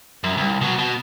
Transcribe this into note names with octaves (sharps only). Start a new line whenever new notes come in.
F#2
C2
B2 F#3
B2